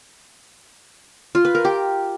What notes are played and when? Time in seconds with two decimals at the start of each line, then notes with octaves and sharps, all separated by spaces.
1.35 F4
1.45 B4
1.55 A#4
1.65 G4